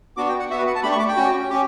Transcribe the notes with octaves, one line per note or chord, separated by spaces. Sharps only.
B3 D4 F#4 D6
G5
F#5
B3 F#4 E5
B4
F#5
A5
A3 D4 G4 B5
C#6
D6
G5
C#4 F#4
C#4 G4